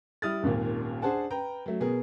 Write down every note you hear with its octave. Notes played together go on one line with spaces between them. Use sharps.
G3 E4 D#6 F6 A6
D#1 G#1 D#2 A#2
D4 G#4 C5 F#5 A5
B4 G5 A#5
F#3 A3
B2 B3 G#4 A#4